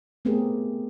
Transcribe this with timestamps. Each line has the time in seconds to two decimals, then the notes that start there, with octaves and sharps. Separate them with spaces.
0.25 A3 B3 C4 G4 G#4 A#4